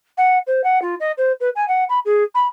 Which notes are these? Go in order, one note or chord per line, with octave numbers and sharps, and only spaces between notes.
F#5
C5
F#5
F4
D#5
C5
B4
G#5
F#5
B5
G#4
B5